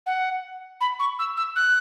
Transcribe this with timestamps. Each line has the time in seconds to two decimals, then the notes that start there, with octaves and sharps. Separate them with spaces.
0.06 F#5
0.81 B5
1.00 C#6
1.19 E6
1.37 E6
1.56 F#6